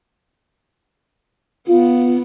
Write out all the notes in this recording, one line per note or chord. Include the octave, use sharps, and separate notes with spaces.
B3 F4